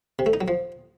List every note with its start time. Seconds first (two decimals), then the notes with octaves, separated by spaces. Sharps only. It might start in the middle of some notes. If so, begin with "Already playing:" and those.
0.19 C3
0.26 A3
0.33 D#4
0.41 F#3
0.48 F3